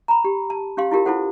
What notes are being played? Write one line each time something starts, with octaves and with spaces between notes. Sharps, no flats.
A#5 B5
G4
A5
C#4 G4 F5 C6
E4 F4 G4 A#4
E4 F4 A4 C5 F#5